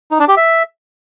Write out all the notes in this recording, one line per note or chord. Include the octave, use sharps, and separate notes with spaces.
D#4
D4
G4
E5